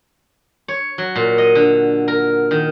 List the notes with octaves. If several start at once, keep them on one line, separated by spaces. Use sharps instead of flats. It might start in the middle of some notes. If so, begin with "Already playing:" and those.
C#5
F#3
A#2
D#5
D3
A#4
D#3